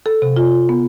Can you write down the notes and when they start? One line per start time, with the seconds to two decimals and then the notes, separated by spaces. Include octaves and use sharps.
0.06 A4
0.22 C3
0.36 F4
0.69 B3